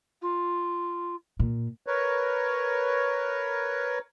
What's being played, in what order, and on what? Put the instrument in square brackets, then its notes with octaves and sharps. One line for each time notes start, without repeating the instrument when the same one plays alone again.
[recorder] F4
[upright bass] A#2
[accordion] A#4 B4 C#5